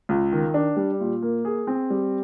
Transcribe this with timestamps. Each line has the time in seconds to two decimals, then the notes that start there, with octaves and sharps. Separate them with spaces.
0.09 C#2
0.32 D#3
0.54 D4
0.76 G3
1.00 A#2
1.22 A#3
1.45 G#4
1.67 C4
1.90 G3